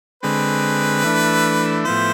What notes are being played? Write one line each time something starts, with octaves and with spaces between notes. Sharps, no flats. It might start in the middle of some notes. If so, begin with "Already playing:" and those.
D3 G#3 C4 B4
E3 A3 D4
A2 F3 B3 E4 C5